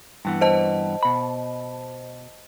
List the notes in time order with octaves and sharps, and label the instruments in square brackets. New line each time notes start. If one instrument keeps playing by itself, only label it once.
[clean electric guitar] G2 E3 B3
[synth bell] C5 D#5 A5
[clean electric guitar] B2 B5